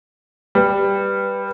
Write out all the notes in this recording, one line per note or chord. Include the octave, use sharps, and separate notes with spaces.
G3 B4